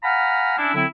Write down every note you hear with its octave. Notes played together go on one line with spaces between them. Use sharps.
F5 F#5 G#5 A#5 B5 F6
C#4 D4 E4
D3 F#3 C4 E4